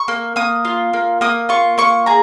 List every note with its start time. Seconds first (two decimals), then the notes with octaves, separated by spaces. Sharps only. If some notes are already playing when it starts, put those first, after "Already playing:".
Already playing: C#6
0.08 A#3
0.36 A#3 D#6
0.65 F4
0.93 A#3
1.21 A#3 D#6
1.49 F4 C#6
1.78 A#3 C#6
2.06 G#4 A#5